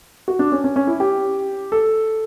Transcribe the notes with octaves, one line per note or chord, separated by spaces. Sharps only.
F#4
D4
C#4
C#4
C#4
E4
G4
A4